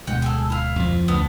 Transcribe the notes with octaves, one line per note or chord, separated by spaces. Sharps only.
D1 B2 G#3 F#5 G5
G#4 A4
E4 F5
F2 F3
D2 B3 D4